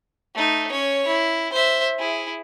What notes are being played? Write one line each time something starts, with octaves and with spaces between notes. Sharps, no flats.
A3 D#4
C#4 C#5
E4
C5 E5
E4 G#4